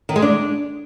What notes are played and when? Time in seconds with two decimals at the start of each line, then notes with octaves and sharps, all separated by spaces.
0.09 D#3
0.16 G#3
0.22 D4